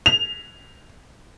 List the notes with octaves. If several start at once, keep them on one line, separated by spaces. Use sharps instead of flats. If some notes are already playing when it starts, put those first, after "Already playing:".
F7